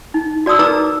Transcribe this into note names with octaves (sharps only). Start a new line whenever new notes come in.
D#4
F#4 D5 A5 D#6 E6
D#4 A#4 B4 A#5 D6 E6